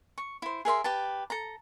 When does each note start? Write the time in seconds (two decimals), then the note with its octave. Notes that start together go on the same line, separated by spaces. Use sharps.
0.18 C#6
0.42 E4 C5
0.65 G#4 A#4 E5 C6
0.84 G4 B4 A5
1.30 A4 A#5